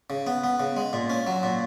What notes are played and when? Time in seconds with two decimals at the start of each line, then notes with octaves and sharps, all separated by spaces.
0.10 C#3
0.27 B3
0.44 B3
0.60 C#3
0.76 G#3
0.93 A#2
1.10 C#4
1.27 F#3
1.43 A#2